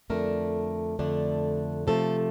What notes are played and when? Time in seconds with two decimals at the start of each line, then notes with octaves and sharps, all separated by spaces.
0.10 F2 D3 A3 D4 A#4
0.99 F2 D3 A3 D4
1.87 C3 F3 A3 A4